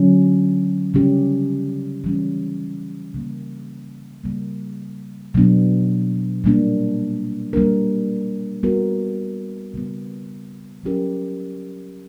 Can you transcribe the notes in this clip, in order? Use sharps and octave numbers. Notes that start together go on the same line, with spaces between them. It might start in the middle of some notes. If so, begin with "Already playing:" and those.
Already playing: D3 F#3 C#4
C#3 G3 C#4 G4
E3 G3 C#4
C#3 G3 A#3
C#3 G3 A#3
B2 F#3 B3 D4
A#2 G3 A#3 D4
G3 A#3 D4 A#4
G3 B3 F#4 A#4
C#3 G3 B3
F#3 C#4 G4 A#4